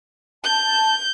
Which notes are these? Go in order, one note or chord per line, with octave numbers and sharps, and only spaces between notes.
A5 G6